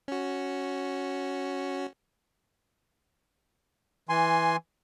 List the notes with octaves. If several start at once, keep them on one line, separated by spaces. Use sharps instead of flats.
C#4 F#4
E3 G#5 C6